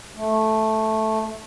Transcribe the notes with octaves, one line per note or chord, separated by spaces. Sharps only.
A3